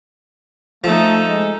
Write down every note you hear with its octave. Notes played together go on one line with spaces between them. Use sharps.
F3 A3 D#4 A4
G#3